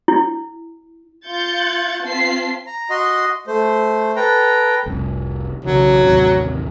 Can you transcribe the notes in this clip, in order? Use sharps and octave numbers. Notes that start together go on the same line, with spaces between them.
E4
F4 G6 A6 C#7
C4 F4 A5 B6 C7
A#5
F#4 D#5 C6
A3 C5
A4 B4 G5 A#5
F1 C2
B1 C#3 E3 F#3
A1 D#2 C3